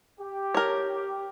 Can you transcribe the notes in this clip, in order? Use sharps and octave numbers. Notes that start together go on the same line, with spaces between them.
G4
A#4 C#5